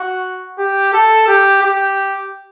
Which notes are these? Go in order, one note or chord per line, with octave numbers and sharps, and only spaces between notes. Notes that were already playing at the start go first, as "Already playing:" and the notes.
Already playing: F#4
G4
A4
G4
G4